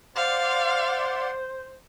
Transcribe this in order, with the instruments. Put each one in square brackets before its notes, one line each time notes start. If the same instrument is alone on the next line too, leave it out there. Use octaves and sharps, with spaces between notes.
[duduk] C5 [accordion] D5 F#5 C6 [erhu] F5